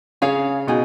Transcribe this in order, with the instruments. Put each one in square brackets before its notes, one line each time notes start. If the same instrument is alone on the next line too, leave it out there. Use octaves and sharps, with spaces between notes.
[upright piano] C#3 [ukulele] G#4 C#5 F5
[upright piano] B2 [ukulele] D#4 G#4